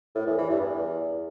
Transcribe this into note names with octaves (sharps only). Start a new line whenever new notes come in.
A2
E2
E3
G2
E2